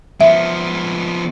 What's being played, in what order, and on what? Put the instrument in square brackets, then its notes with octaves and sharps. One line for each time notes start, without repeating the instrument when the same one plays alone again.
[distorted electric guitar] F3 B3 [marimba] E5